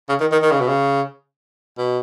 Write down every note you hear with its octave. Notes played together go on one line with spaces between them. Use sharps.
C#3
D#3
D#3
D#3
C#3
B2
C#3
B2